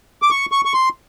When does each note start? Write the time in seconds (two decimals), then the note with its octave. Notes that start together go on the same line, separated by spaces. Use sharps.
0.22 D6
0.31 C#6
0.52 C#6
0.65 C#6
0.74 C6